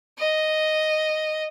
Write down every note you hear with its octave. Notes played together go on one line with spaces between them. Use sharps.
D#5